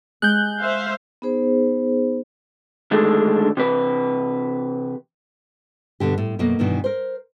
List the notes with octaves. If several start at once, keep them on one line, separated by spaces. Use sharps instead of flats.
G#3 F#6 G6
C5 E5 F5
B3 D#4 G#4 C5
D3 D#3 G#3 A3 D4
C3 E3 B4
G2 B2 D3 G4
A2
F#2 B2 A3 A#3
G2 B2 D#3 E3
A#4 C5